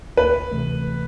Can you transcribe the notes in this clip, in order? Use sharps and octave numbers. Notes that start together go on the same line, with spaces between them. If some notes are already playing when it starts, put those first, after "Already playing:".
D2 B4
C3 E3 A3